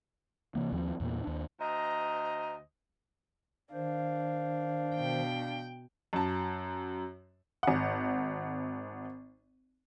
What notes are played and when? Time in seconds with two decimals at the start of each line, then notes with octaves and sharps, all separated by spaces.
0.55 C3 E3 A#3
0.72 D#2 F3 C4
1.00 E2 A#2 A#3
1.23 D#2 D4
1.60 D2 C5 D#5 A#5
3.73 D#3 D4 C5 F5
4.95 B2 G5
6.13 F#2 A5
7.63 G#1 F#5